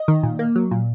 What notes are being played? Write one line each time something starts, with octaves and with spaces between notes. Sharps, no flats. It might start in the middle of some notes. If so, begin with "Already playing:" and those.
Already playing: D#5
D#3
A#2
A#3
F#3
A#2